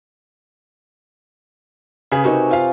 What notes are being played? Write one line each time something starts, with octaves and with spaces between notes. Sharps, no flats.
C#3 G#4 B4
C3 D#4 F#4 A#4 G#5 C#6
F4 F5